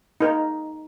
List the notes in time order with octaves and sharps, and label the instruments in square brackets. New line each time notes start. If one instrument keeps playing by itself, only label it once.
[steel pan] D#4 A#4